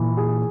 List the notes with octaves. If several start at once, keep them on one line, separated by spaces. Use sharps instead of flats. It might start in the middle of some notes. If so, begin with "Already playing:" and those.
Already playing: A#2 E3
G#4